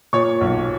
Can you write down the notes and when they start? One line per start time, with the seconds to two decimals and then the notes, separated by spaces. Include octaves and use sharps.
0.13 A#2 C#5 C#6
0.41 B1